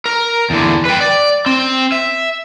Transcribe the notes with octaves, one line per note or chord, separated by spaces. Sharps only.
A#4
E2 D3
B4 G5
D5
C4
E5